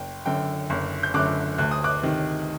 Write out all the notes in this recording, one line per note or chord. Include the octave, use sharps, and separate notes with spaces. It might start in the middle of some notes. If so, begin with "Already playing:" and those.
Already playing: F#1 G5
F#2 D3 G5
F#1
G6
F#2 D3 D6 F#6
D2 F#6
D#6
D6 F#6
C3 D#3